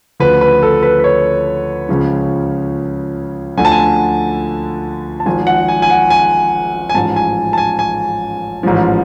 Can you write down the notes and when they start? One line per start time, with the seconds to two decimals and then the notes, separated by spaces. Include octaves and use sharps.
0.20 D2 C#3 F3 B4
0.41 B4
0.63 A4
0.83 B4
1.00 B4
1.04 C#5
1.89 C#2 C#3 F3
3.57 D2 D3 F3 G#5
3.65 A5
3.72 G#5
5.20 A5
5.26 G#1 G#2 F3 G#5
5.47 F#5
5.68 G#5
5.82 G#5
5.90 F#5
6.10 G#5
6.90 G#5
6.95 A1 G#2 F3 A5
7.16 G#5
7.53 A5
7.58 G#5
7.79 G#5
8.63 A1 G#2 F3